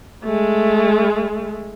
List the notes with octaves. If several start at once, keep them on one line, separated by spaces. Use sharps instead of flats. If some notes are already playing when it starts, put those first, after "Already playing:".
G#3 A3